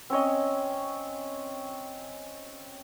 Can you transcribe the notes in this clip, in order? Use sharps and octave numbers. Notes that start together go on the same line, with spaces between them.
C4 C#4 C#5 D#5